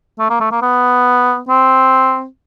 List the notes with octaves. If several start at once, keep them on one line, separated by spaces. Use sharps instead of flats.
A3
A#3
A3
A#3
B3
C4